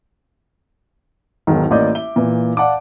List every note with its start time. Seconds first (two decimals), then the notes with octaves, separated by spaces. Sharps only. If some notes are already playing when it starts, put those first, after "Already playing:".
1.47 E1 B1 G#2 D#3
1.71 A1 A#3 D5 D#5 D6 G6
1.95 E5 G7
2.16 A#2 E3
2.57 D5 F5 F#5 A5 D6